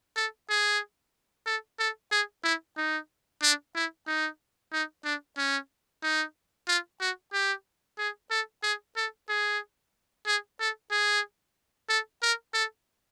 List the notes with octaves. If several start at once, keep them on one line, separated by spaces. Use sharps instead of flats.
A4
G#4
A4
A4
G#4
E4
D#4
D4
E4
D#4
D#4
D4
C#4
D#4
F4
F#4
G4
G#4
A4
G#4
A4
G#4
G#4
A4
G#4
A4
A#4
A4